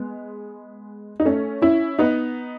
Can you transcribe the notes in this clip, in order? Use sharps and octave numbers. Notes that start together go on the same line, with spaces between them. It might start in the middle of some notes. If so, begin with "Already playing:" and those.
Already playing: G#3 B3
D#4
A3 C#4
C#4 E4
B3 D#4